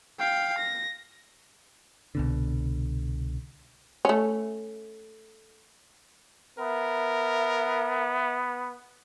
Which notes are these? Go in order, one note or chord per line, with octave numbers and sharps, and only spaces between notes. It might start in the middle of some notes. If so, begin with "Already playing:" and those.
F5 G5
A#6
C2 B2 D3
A3 C#4
B3 A#4 E5